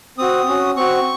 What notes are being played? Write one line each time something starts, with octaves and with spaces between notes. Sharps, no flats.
C4 F#4 D#6
C#4 F#4
C4 F#4 C#6